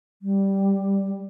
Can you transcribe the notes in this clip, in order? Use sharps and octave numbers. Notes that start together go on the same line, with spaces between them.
G3